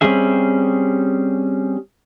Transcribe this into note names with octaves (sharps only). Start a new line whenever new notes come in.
G3 C4 C#4 G#4 E5